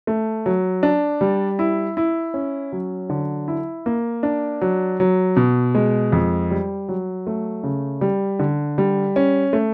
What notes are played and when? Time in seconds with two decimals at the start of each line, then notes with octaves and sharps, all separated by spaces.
0.07 A3
0.46 F#3
0.83 D4
1.21 G3
1.59 E4
1.97 E4
2.34 C#4
2.72 F#3
3.10 D3
3.48 E4
3.86 A#3
4.23 D4
4.61 F#3
5.00 F#3
5.36 B2
5.75 G#3
6.12 F2
6.51 G3
6.89 F#3
7.27 A3
7.63 C#3
8.01 G3
8.39 D3
8.78 G3
9.16 C#4
9.53 A3